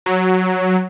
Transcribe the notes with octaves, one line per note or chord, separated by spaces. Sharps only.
F#3